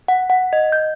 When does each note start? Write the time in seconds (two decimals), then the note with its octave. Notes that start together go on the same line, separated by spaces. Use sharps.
0.08 F#5
0.30 F#5
0.53 D#5
0.72 G6